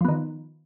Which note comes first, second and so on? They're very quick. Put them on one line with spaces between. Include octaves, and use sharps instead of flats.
F3 B3 D#3